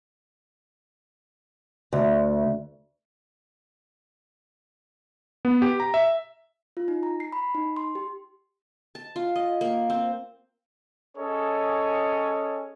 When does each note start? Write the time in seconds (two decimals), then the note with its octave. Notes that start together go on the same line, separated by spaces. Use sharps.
1.93 D2
5.45 B3
5.62 G4
5.80 A#5
5.94 E5
6.77 F4
6.88 D#4
7.03 A#5
7.20 C7
7.32 B5
7.55 D#4
7.76 C6
7.95 G4
8.95 A5
9.16 F4
9.36 D#5
9.61 A#3
9.90 C4
11.17 C#4 G#4 A4 C#5 D#5